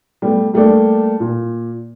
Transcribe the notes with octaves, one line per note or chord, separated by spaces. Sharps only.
G3 A3 B3
G3 A3 A#3 D4
A#2